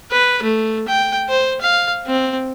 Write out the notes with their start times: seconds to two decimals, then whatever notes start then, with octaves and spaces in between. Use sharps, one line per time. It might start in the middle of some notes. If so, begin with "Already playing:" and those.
0.11 B4
0.43 A3
0.88 G5
1.29 C5
1.61 F5
2.07 C4